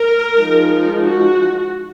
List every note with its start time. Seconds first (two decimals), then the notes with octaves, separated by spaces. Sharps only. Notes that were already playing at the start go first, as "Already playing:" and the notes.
Already playing: A#4
0.36 F3 G#3 D#4
1.02 F#4